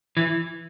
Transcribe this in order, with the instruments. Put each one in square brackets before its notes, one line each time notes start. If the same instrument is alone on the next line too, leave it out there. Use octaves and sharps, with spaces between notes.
[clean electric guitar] E3